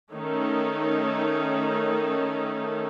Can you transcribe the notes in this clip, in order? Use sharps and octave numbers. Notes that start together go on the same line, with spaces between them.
D#3 A3 C#4 D#4